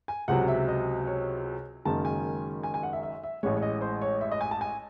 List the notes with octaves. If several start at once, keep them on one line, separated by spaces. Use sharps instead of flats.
G#5
C#2 C3 F#3 F#5
E5
D#5
C#5
F#1 F#2 D#3 G#3 A5
G#5
G#5
G#5
F#5
E5
E5
E5
A1 A2 G#3 C#5
C#5
D#5
C5
C#5
E5
D#5
G#5
A5
G#5